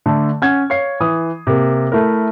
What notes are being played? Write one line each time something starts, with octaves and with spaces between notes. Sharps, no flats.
D3 A3
C#4 F#5 G#6
C#5 F5 C7
E3 D#6
C3 A#3
A3 E4 A#4